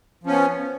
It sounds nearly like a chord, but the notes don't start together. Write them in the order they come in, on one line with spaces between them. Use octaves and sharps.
F3 C#4 B3